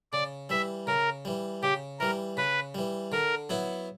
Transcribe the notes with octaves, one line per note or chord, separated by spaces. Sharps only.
C#3 D5
E3 G3 E5
C#3 A#4
E3 G3
C#3 G4
E3 G3 A#4
C#3 B4
E3 G3
D3 A#4
F#3 B3 E4